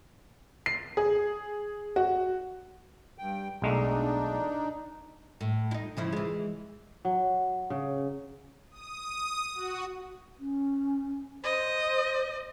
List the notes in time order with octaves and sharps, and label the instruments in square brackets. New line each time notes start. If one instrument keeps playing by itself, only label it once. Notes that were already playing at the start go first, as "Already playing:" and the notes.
[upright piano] C7
G#4
F#4
[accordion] G2 G5
[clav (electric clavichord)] B1 G#3 A3 [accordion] D4 D#4
[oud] A2
D#4 E4
C#3 F3 E4
E3 G#3
[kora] F#3
C#3
[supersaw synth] D#6
F#4
[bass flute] C#4
[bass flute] C5 [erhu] D#5